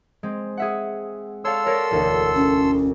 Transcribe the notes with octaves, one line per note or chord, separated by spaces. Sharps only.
G#3 C4
G#4 E5 F#5
A4 C#5 D5 F5 C6 E6
A#4 C#5 D5
E1 D2 D4
C#4